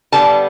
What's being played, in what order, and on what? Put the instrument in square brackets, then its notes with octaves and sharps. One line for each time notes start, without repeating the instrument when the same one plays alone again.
[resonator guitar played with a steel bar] D3 G3 B3 A5